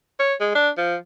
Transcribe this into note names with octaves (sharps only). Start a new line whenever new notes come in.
C#5
G#3
D4
F3